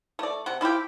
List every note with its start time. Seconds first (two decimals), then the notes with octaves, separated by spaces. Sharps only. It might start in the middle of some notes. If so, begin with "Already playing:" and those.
0.19 A3 D5
0.46 C3 F#5
0.61 F3 E4 F4 G4